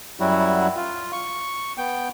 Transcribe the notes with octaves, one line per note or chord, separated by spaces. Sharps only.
F#2 F#3 G3 E4 F#4
F4
C#6
B3 G5